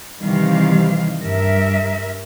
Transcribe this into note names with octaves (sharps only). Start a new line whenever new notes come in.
C3 D#3 E3 G3 F5
G2 A#4 E5